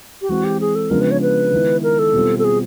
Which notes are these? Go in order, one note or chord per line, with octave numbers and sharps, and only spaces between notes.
G4
E3 G#3 C4 F#4
G4
G#4
A4
C#3 F3 G#3 B3 D4 A#4
B4
C#5
B4
D#3 G#3 B3 E4
A#4
A4
B2 G3 C4 F4
A4
G#4